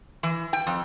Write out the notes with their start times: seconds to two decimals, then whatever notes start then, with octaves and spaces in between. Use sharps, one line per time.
0.23 E3
0.53 G5
0.67 F2